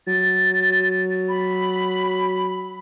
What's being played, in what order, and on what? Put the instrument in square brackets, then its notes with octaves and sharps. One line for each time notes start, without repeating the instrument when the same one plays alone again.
[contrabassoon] F#3 [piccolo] A6
[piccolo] B5